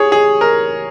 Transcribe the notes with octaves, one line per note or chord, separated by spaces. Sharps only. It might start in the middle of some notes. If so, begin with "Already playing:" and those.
Already playing: G#4 C#5
G#4
A#4